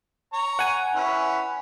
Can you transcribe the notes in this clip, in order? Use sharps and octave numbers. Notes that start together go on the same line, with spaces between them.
C#5 A#5
F#5 G#5
C#4 E4 B4